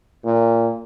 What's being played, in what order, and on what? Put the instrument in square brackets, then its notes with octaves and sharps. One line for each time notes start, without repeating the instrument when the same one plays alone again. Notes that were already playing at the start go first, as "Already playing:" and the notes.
[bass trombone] A#2